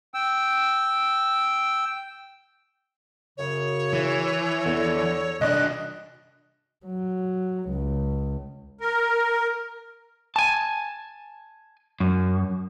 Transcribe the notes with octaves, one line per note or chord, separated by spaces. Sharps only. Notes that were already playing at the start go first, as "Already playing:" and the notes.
G5 E6
F#2 C#3 C#5
E3
E2 D3 A4
C2 D4 D5 D#5 F#6
F#3
C#2
A#4
G#5 A5
F#2